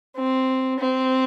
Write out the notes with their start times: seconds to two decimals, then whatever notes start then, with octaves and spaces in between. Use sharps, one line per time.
0.16 C4
0.79 C4